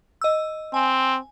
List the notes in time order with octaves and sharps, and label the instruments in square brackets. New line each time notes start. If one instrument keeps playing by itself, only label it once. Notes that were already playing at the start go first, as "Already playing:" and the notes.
[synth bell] D#5 E6
[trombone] C4 [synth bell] G#5